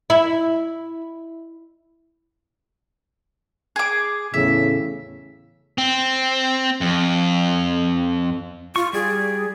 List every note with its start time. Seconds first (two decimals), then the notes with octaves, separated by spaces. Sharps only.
0.10 E4
3.76 G#4 D6
4.34 E2 A2 C#3 E5
5.78 C4
6.81 F2
8.76 F4 C#6
8.93 G3 G#4 D5